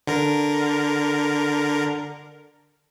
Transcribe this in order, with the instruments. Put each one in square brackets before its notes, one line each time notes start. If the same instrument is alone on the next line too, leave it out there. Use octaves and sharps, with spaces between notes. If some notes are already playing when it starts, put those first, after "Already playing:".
[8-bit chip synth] D3 A#4